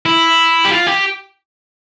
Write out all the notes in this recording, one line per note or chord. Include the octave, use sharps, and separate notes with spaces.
E4
G4
F4
G4